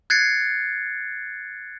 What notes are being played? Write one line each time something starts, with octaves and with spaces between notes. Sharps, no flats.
F#6 G#6 A6 C7 C#7